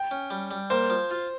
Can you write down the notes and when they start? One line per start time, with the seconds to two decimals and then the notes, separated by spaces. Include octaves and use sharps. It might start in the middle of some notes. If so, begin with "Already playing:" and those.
Already playing: G5
0.11 C#4
0.30 G3
0.51 G3
0.70 A#3 C5
0.90 F3
1.11 F4